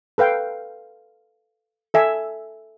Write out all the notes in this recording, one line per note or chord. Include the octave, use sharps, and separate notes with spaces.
A4 B4 F5 G5
A4 E5 G#5